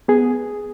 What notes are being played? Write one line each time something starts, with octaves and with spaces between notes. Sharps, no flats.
B3 G#4